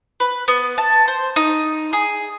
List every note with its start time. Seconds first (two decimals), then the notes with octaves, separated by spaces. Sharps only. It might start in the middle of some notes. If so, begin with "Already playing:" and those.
0.20 B4
0.48 B3
0.78 A5
1.08 C5
1.36 D#4
1.93 G#4